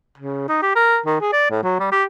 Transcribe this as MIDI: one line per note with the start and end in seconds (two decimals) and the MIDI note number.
0.18 0.46 49
0.48 0.62 63
0.62 0.71 67
0.75 0.99 70
1.06 1.17 51
1.21 1.31 68
1.32 1.45 74
1.50 1.63 45
1.63 1.76 54
1.79 1.89 55
1.92 2.04 67